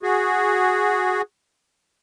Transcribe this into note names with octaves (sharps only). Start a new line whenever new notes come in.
F#4 G#4